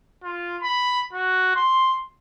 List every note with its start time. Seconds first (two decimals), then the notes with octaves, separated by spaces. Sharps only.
0.24 F4
0.62 B5
1.13 F#4
1.55 C6